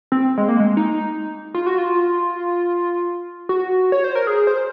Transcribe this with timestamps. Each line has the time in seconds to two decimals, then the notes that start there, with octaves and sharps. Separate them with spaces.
0.12 C4
0.38 G#3
0.49 A#3
0.60 G#3
0.77 D#4
1.54 F4
1.66 F#4
1.78 F4
3.49 F#4
3.92 C#5
4.04 C5
4.15 A#4
4.27 G#4
4.47 C5